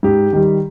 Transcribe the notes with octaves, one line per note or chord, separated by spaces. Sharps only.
G#2 G4
D#3 G3